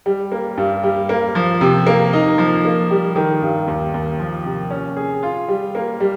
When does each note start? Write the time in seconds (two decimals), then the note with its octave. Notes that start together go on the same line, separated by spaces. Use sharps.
0.06 G3
0.32 A#3
0.57 G2
0.83 G3
1.09 A#3
1.35 F3
1.61 C3
1.87 A#3
2.13 D#4
2.38 F3
2.65 A#3
2.91 G3
3.16 D#3
3.42 G2
3.67 D#2
3.94 D#2
4.19 F3
4.45 C3
4.70 C#4
4.97 G#4
5.23 F4
5.48 G3
5.75 A#3
6.00 G3